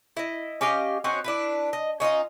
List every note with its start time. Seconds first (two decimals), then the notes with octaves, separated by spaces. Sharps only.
0.17 E4 D#5
0.61 C#4 G4 D#5 F5
1.04 C4 C#4 D#4 F#4
1.24 D4 E4 B4
1.73 D#5
2.00 C#4 D#4 F4 D#5